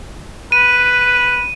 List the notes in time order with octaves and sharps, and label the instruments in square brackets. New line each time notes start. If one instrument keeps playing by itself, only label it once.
[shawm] B4 [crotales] D#7